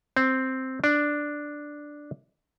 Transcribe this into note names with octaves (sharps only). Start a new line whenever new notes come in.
C4
D4